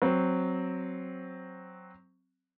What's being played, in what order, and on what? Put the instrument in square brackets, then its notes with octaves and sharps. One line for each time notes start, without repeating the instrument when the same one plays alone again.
[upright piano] F#3 C4